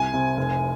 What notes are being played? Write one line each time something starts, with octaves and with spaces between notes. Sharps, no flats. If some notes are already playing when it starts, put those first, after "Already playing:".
Already playing: C2 G#5
C3
F1